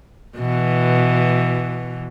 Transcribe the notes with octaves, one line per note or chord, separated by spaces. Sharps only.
B2 E3